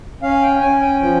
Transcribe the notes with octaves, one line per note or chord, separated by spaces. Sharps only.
C#4 F5
G5
C#4 G#5
G5
F3 G5